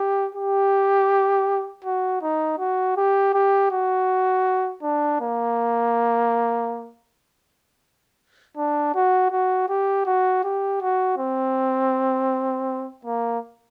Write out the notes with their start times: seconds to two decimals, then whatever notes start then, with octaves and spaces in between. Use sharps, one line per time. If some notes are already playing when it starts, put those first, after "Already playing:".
Already playing: G4
0.35 G4
1.85 F#4
2.22 D#4
2.59 F#4
2.97 G4
3.34 G4
3.71 F#4
4.83 D4
5.21 A#3
8.57 D4
8.95 F#4
9.31 F#4
9.69 G4
10.06 F#4
10.44 G4
10.82 F#4
11.18 C4
13.05 A#3